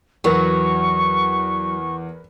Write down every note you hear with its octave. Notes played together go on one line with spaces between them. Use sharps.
E2 F#3 A#4 B4 C#6